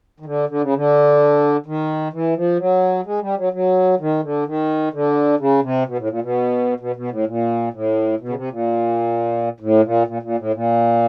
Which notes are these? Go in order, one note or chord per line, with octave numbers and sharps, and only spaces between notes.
D#3
D3
D3
C#3
D3
D#3
E3
F3
F#3
G#3
G3
F#3
F#3
D#3
D3
D#3
D3
C#3
C3
B2
A2
A#2
B2
B2
B2
A2
A#2
A2
B2
C#3
C3
A#2
A2
A#2
A#2
A#2
A2
A#2